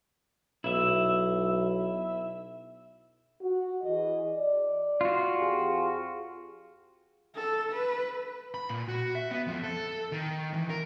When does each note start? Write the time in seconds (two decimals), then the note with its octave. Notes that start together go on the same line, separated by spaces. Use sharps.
0.64 B1 E4 E5
3.41 F#4
3.82 E3 G#4 D#5
4.27 D5
5.01 F4 F#4
5.37 F2 G4 G#4
7.36 A4
7.72 B4
8.54 B5
8.69 A#2
8.88 F#4
9.15 E5
9.31 B3
9.47 F2
9.63 A4
10.12 D#3
10.54 E3
10.70 A#4